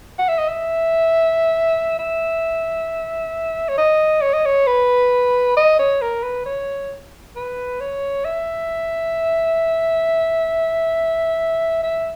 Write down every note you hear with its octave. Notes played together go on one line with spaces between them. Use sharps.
F#5
E5
D#5
E5
E5
C#5
D#5
C#5
D#5
C#5
B4
D#5
C#5
A#4
B4
C#5
B4
C#5
E5
E5